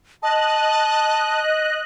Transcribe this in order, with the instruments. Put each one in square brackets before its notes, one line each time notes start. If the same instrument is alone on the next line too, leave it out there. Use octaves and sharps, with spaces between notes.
[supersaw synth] D#5 F#6 [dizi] A5